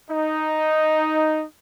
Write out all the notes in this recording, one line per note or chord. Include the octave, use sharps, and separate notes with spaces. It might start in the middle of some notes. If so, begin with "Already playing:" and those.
D#4